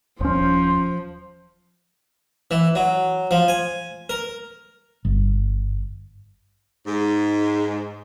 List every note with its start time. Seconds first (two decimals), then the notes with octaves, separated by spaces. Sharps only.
0.21 D#1 F3 C#4 C5
2.51 E3
2.75 F#3
3.31 F3
3.48 G#5
4.10 A#4
5.05 G1
6.86 G#2